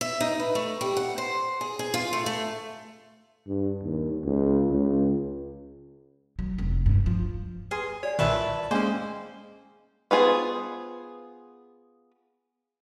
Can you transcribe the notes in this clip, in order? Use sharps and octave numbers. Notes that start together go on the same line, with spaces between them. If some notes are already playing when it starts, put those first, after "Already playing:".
E5
D#4
B4
A3
G3
F#5
C5
G#4
G#4
F4
A3
A3
G2
D#2
C#2
C#2
F#3
F1
G2
F3
G#4 B4 C6
F#4 C#5 D5 G#5
C2 A#2 D#3 B4 E5 A5 C#6
G#3 A#3 C#4 C5 G5 D6
B3 F4 G#4 C5